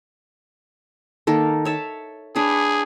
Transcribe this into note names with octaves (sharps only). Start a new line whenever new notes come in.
D#3 A#3 A4
C#5 E5 A5
D4 G#4 B4 C#5